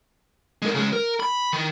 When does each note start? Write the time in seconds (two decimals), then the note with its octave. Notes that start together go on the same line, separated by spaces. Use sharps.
0.62 G#3 A#4
0.75 C#3 G#3
0.93 A#4
1.20 B5
1.53 D#3